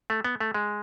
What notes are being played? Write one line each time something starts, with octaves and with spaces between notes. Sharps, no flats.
A3
B3
A3
G#3